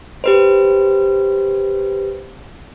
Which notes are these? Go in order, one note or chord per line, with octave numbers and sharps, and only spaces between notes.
G4 B4 C5